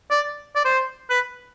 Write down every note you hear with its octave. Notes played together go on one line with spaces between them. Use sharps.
D5
D5
C5
B4